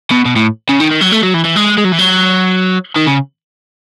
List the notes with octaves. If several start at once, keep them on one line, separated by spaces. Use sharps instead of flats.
B2
B2
A2
C#3
D#3
D#3
F#3
A3
F#3
E3
E3
G#3
G#3
F#3
E3
F#3
D#3
C#3